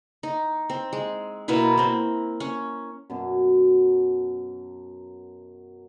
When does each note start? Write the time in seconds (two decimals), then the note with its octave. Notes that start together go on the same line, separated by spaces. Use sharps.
0.23 D#4
0.70 C4
0.93 G#3
1.48 B2 A#3 E4 B4
1.77 A#3 C4
2.40 C#4
3.10 F#2 B2 F#3